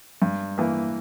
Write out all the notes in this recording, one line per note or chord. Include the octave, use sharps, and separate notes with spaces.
G2
E3 A#3